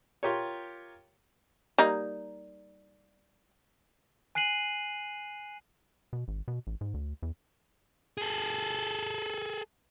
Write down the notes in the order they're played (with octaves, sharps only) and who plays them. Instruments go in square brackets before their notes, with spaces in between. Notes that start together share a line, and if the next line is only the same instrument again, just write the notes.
[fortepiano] F4 G4 A#4 C#5
[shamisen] G3 A#3 D#4
[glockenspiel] G#5 F#6 C7 D#7 F#7
[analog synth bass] B2
G#1
B2
A1
G#2
D2
E2
[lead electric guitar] G#4 A4